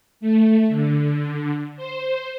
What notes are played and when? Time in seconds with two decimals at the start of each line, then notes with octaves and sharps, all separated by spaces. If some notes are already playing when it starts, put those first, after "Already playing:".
0.20 A3
0.69 D3
1.76 C5